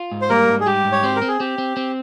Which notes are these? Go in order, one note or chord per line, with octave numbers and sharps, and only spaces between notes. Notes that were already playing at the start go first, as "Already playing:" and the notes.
Already playing: F4
G#2
C5
G3 A#3 A#4
G#2
G#4
G3 G4
G#2
C#5
C4 C5
A#4
C4
G#4
C4 G4
C4
C4